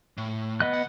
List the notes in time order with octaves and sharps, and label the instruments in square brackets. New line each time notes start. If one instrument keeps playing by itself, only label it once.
[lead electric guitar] A2
[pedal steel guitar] B3 D#5 F#6
[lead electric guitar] D2 F#5